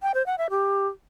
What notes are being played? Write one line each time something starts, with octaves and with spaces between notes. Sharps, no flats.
G5
C5
F#5
E5
G4